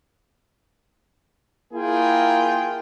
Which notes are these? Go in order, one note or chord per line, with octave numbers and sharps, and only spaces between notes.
A#3 E4 F4 G#4 G5